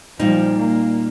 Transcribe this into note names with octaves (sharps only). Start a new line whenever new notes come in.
A#2 F3 G3 D#4
A#3